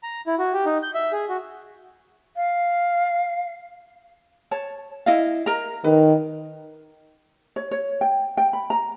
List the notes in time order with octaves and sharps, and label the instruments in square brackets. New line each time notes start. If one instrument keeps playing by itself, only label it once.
[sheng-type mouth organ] A#5
E4
F#4
G4
D#4
G6
E5
G#4
F#4
[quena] F5
[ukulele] C#5 A5
E4 D#5 F5
A#4 D#5 A#5
[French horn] D#3 [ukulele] B4
[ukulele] C#5
C#5
G5
G5
B5
A#5